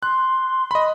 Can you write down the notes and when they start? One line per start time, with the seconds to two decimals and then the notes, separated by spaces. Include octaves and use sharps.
0.03 C6 F#6
0.71 D#5 B5